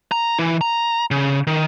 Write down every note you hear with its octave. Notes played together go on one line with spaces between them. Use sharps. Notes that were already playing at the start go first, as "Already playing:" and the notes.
A#5
E3 E4
A#5
C#3
D#3